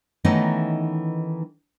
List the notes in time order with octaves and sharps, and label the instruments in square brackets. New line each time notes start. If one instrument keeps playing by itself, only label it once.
[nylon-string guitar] D#3 E3 A3 B3 C#4 D#4